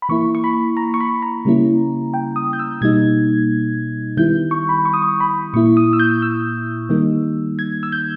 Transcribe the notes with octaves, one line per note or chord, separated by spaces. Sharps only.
B5
E3 A#3 E4 C#6
C#6
B5
A#5
C#6
B5
A#5
C#3 G3 A#3 C#4 E4
G5
D#6
G6
E6
B2 G3 A#3 D#4 G#6
D#3 G3 B3 E4 G6
C#6
B5
C#6
D#6
C#6
B5
A#2 A#3 E4 C#6
D#6
E6
G6
E6
D#3 G3 A#3 D#4
G#6
E6
G6